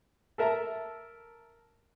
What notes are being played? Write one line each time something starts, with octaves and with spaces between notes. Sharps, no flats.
A4 A#4 E5 A5 A#5